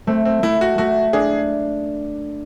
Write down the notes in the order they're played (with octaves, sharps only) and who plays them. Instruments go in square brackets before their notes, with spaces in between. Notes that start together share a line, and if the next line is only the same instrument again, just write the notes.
[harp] A3 [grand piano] C4
[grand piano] C4
[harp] A3 [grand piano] E4
[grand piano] F#4
[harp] A3 [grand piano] F#4
[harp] D4 [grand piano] G#4